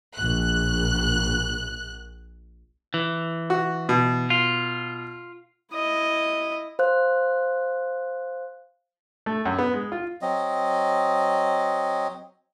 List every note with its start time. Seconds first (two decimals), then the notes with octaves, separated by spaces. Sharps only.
0.16 A#1 F#6
2.94 E3
3.50 F#4
3.89 B2
4.30 F4
5.73 E4 D#5
6.79 C5 F5 F#6
9.26 A3
9.46 F#2
9.59 B3
9.74 G#3
9.92 F4
10.22 F#3 C4 D#5